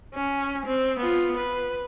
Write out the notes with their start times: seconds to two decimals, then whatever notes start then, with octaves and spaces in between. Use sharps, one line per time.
0.14 C#4
0.65 C4
0.99 B3 F4
1.37 B4